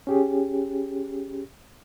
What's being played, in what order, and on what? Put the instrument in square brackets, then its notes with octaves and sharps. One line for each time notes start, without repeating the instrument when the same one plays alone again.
[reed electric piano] C#4 G4 G#4